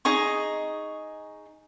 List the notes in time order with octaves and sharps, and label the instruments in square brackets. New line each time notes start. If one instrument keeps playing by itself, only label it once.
[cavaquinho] D#4 G#4 D#5 C#6